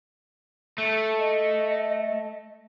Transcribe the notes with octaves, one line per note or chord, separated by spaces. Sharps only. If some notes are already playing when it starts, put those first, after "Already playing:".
A3
D#5